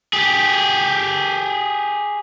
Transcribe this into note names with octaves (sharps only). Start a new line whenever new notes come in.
G4 G#4